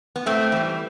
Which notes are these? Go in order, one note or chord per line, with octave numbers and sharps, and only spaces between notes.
B3
A2 A3 C4
E3 G3